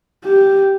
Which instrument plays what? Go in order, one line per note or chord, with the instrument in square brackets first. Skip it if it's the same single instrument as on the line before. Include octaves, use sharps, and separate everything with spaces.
[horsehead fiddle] G4